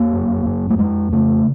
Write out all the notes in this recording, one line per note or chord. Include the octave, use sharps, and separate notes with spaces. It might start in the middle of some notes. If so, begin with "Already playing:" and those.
Already playing: F2 A#3
F#2
F#2
A3
F2 G#3
C#3 A3